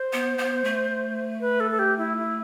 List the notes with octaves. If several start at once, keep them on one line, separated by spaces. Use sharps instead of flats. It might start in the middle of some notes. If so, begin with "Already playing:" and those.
Already playing: C5
B3
B3
A3
B4
A4
A4
G4
E4
E4